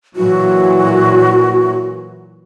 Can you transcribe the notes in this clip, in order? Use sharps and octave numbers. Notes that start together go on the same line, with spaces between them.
A#2 E3 F#3 F#4